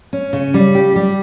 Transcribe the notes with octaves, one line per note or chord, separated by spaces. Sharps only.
C#4
C#3
G3
G4
G3